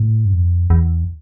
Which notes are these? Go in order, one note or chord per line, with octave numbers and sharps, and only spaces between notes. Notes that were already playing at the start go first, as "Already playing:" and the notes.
Already playing: A2
G2
F2
E2